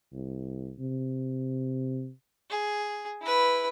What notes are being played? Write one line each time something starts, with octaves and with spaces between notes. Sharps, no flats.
C2
C3
G#4
E4 B4